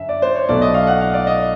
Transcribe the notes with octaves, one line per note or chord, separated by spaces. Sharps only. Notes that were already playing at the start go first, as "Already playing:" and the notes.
Already playing: F#2 D3 E5
D5
C5
C#5
B1 B2 F#3 A3 D5
D#5
F5
F#5
F5
D5
D#5